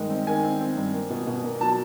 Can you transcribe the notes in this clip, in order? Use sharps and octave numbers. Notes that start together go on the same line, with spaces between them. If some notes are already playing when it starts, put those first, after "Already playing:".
Already playing: G2 D#3 G#3
C4
D#3 G#5
C4
C4
G2
A#3
B2
B2
A#3
F#3 A5